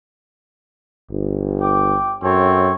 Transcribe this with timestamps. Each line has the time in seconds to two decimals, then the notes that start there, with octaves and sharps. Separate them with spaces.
1.11 G1
1.61 G5 D6
2.23 F#2 C4 A4 C#5